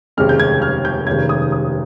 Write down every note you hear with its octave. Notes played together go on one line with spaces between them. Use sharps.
F1 D#2 C#3 G#3 C4 F6
G6
G#6
F6
G6
F1 D#2 D#3 G#3 C#4 G#6
D#6
D#6